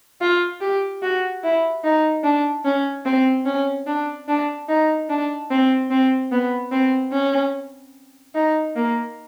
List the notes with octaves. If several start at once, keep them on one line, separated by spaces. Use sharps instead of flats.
F4
G4
F#4
E4
D#4
D4
C#4
C4
C#4
D4
D4
D#4
D4
C4
C4
B3
C4
C#4
D#4
A#3